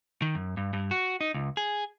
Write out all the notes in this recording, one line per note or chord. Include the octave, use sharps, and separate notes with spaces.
D#3
F#2
G2
G2
F#4
D#4
C#2
G#4